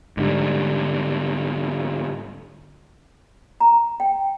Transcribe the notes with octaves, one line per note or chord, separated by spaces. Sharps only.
G#2 D3 G3
A#5
G5